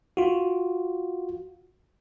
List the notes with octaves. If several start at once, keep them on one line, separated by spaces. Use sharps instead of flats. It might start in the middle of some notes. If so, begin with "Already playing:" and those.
F4 F#4